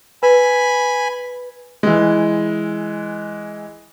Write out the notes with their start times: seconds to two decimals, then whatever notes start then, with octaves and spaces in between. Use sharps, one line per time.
0.23 B4 G#5 B5
1.83 E3 G#3